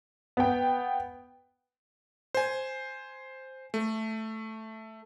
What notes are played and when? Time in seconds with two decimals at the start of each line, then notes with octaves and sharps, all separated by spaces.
0.37 B3 G5
2.35 C5 G#5
3.74 A3